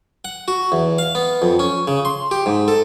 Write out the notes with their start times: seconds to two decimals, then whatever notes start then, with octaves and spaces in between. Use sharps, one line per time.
0.25 F#5
0.48 F#4
0.72 E2
0.98 F5
1.15 B3
1.42 F2
1.59 C#4
1.88 C#3
2.05 C6
2.31 G4
2.46 G#2
2.68 A4